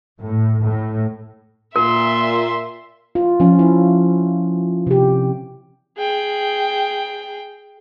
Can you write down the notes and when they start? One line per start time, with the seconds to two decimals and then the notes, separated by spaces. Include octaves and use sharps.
0.22 A2
0.63 A2
1.76 A#2 A#4 E5 C6
3.15 F4
3.40 F3 C#4
3.59 E4
4.87 C3 G4
5.98 G#4 G5